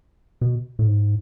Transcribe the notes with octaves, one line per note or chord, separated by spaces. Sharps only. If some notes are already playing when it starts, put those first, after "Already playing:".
B2
A2
G#2